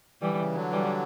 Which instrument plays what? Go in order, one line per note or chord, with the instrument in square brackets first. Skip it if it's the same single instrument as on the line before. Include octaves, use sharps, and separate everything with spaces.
[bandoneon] D3 [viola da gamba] E3 G3
[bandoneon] C#3 E3
D3 F#3
[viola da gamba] E3 G3